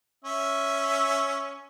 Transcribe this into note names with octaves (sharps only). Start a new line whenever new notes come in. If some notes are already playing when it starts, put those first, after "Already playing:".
C#4 E5